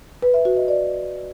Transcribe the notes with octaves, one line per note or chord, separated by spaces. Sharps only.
B4
E5
F#4
D#5
D5